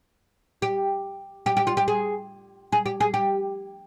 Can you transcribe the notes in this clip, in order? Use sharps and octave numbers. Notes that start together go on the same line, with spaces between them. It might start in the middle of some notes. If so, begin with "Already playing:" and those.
G4
G4
G4
F4
G4
G#4
G#4
G4
G#4
G4